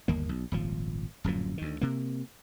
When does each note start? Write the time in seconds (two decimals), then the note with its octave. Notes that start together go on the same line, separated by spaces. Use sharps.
0.08 G1 D#2 A#3
0.29 B1
0.52 D#1 G#1 F3
1.24 D1 F#2 A#2 F3
1.58 D2 D#3
1.81 C3 A#3